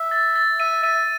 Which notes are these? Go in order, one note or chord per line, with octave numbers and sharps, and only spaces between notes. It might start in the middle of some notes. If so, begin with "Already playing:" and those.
Already playing: E5
A6
A6
E5 D#7
E5 D#7